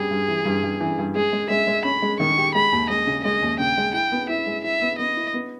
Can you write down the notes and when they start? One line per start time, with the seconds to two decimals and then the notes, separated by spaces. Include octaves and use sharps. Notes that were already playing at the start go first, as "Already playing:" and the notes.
Already playing: G2 G3 G#4
0.11 G2
0.28 E3
0.45 G2
0.63 G2
0.80 E3
0.98 G2
1.16 G#3 G#4
1.33 G#3
1.50 G#3 E5
1.67 G#3
1.84 C#4 B5
2.02 G#3
2.20 D#3 C#6
2.38 G4
2.55 G#3 B5
2.72 D#2
2.90 G#3 D#5
3.07 C#3
3.24 G#3 D#5
3.42 D#2
3.60 C#3 G5
3.77 G#3
3.94 E4 G5
4.12 B3
4.29 E4 E5
4.46 G#3
4.64 E4 E5
4.82 B3
4.98 B3 D#5
5.17 E4
5.34 B3